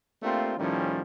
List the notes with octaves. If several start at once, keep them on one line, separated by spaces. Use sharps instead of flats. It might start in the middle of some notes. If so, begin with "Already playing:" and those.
A3 A#3 C4 D4 F4 G4
A2 D#3 F3 G3 C#4